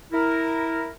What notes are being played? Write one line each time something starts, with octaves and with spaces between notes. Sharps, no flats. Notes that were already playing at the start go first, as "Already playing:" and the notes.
E4 A#4